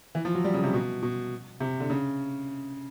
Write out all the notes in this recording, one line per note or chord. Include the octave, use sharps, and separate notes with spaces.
E3
F3
F#3
G3
C#3
C3
B2
B2
C3
D3
C#3